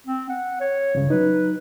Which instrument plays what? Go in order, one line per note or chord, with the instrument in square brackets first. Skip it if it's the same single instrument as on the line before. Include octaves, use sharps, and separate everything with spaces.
[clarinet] C4
F#5
C#5
[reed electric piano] C#2 G2 C#3
[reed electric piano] F#3 D#4 [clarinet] B4